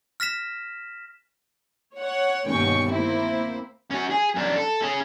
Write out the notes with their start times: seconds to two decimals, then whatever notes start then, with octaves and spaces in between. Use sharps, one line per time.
0.20 F6 A#6 B6 E7
1.96 C#5 F#5
2.47 G1 D#2 B2 C#4 G5 C#6
2.90 A#3 C4 E4 C5
3.91 C#4 F#4
4.10 G#4
4.35 F#2 D4
4.56 A4
4.82 C#4 G#4